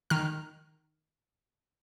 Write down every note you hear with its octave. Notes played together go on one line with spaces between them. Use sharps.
D#3 F6